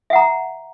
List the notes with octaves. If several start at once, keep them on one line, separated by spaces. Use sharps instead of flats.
E5 F#5 A#5